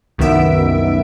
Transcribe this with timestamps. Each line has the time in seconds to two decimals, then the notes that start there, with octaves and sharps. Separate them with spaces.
0.18 C2 F#2 D#3 B3 E5 D7